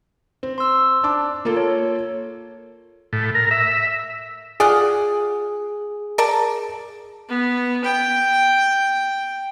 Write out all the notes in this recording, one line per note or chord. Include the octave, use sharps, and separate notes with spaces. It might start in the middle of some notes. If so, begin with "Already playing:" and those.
C4
C6 E6
D4 A5 D6
A#3 F4 A4
C#5
A2
A#4
E5
F4 G#4 D5 F#5
A#4 D5 A5
B3
G5